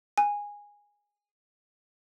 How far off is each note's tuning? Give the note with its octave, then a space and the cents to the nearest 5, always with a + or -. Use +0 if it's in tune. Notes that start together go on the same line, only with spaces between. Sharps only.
G#5 -15